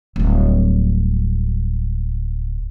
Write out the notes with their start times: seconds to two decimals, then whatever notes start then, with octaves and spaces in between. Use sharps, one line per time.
0.16 D1 G3